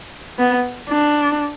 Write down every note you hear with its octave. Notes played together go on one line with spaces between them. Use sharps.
B3
D4